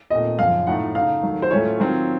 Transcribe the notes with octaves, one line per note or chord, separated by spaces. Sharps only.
A#2 A3 C4 D#5
F#2 C#3 F3 F5
A2 A3 D#4 F#5
C#3 A3 D#4 F5
D#3 F#3 A3
C5
A2 F#3 A3 C#4 F4 C#5
D#3 F#3 C4 F4